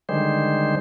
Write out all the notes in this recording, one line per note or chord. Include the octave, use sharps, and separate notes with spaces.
D3 D#3 G3 G#3 C5